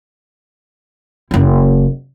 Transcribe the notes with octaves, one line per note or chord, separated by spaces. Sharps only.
F#1 E4